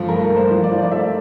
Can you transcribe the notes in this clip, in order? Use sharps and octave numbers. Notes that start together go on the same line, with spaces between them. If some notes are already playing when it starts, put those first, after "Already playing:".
Already playing: G2 F3 A4
A3 A#4
G2
C5
F3
D5
F3
D5
A3 E5